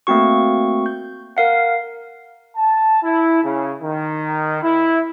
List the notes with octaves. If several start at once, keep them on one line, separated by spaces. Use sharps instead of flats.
A3 A#3 C4 F#4 C#6
G6
A#4 F5 F#5
A5
E4
C#3
D#3
E4